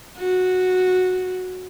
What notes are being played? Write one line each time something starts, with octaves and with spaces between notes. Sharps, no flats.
F#4